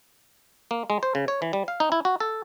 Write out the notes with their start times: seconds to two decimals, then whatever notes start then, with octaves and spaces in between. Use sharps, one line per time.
0.71 A#3
0.90 G#3
1.03 C5
1.15 C#3
1.28 C#5
1.42 E3
1.53 G3
1.68 F5
1.80 D#4
1.92 E4
2.05 F#4
2.20 A4